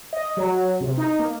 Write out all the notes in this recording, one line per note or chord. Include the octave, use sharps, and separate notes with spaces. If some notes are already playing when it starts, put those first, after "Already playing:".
D#5
F#3
C3
D#4
A#3